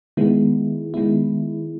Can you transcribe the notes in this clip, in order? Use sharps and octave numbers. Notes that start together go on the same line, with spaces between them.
D#3 G#3 B3 E4
D#3 G#3 B3 E4